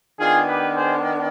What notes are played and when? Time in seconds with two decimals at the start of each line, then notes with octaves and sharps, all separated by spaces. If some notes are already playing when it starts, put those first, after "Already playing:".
0.19 D#3 B3 D4 F4 G#4
0.48 G4 B4
0.76 G#4 C5